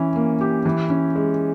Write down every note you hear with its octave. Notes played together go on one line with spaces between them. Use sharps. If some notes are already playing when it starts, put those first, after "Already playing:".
Already playing: E3 C#4
A#3
G4
E3
C#4
G#3